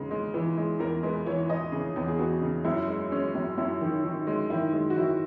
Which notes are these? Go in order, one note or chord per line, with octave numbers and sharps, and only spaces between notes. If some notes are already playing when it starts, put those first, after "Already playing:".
Already playing: E2 C#3 G#3
G#3
E3
G#3
E2 A#4
G#3 B4
E3 C#5
E3 D#5
C#3 G#4
E2
G#4
E2 F#4
C#3
F#2 E4
G#3
G#3 C#4
F#2
F#2 E4
D#3
D#3
G#3
D#3 E4
G#3
F#4
D#3 E4